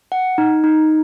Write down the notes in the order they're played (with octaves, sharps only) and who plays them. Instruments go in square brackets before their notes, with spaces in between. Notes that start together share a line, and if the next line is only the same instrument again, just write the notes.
[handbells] F#5
D#4
D#4